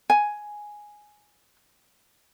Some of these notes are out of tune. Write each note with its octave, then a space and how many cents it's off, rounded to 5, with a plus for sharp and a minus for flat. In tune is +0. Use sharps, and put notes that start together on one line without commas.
G#5 +5